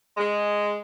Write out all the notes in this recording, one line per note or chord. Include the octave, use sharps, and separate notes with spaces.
G#3